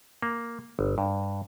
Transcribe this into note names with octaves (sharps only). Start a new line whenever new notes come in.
A#3
G1
G2